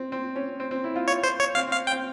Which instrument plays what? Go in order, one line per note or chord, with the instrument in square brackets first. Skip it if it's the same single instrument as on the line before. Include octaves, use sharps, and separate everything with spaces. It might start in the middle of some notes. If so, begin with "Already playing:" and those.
Already playing: [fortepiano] C4
C4
C#4
C4
C4
E4
F4
[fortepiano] F4 [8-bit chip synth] C#5
[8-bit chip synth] C5
C#5
[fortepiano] C4 [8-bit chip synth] F5
[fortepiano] C4
[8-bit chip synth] F5
G5
[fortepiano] C4